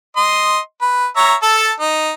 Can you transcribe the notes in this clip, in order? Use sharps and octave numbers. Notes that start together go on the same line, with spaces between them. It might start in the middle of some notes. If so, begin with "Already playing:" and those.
D#5 C6
B4
C#5 E5 A#5
A4 A5
D#4